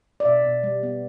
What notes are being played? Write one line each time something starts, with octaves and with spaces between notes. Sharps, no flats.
D5
B2 E5
B2
G3
B3